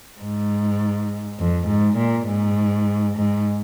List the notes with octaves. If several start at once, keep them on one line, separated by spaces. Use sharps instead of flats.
G#2
F2
G#2
A#2
G#2
G#2